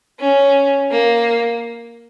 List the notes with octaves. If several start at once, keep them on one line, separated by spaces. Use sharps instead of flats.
C#4
A#3